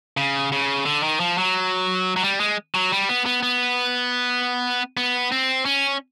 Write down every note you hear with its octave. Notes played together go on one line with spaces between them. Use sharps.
C#3
C#3
D3
D#3
F3
F#3
F#3
G3
G#3
F#3
G3
B3
B3
B3
B3
C4
C#4